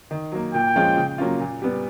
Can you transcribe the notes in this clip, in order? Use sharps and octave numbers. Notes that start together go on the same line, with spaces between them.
D#3
F#3 A#3
A#2 G5
F3 G#3 C#4 F4
C#3
F#3 A#3 C#4 F4
A#2
G3 B3